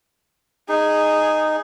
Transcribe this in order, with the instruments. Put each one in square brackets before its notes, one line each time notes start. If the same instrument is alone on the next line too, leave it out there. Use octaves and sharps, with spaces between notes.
[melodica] D#4 [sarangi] G#4